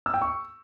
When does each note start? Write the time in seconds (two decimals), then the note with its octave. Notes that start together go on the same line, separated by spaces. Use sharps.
0.06 E6
0.14 G5
0.22 C#6